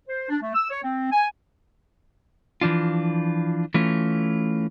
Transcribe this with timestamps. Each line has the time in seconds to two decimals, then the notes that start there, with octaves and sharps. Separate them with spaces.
0.08 C5
0.29 D4
0.42 A3
0.54 E6
0.70 C#5
0.83 C4
1.11 G#5
2.61 E3 F3 D4 F4
3.74 E3 A3 C#4 F4